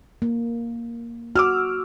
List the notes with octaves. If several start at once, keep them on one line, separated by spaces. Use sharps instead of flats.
A#3
F#4 D6 E6 F6